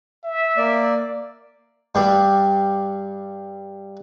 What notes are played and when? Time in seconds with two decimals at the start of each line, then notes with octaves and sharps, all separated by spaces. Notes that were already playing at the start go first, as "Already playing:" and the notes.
0.24 E5
0.57 A#3 D5
1.95 G2 G3 G4